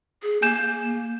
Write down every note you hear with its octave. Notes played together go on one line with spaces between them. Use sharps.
G#4
A#3 G#5 G6 E7